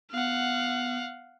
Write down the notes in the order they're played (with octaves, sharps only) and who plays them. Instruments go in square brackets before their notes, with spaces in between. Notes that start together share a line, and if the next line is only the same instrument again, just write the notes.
[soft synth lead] B3 [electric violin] F5 F#5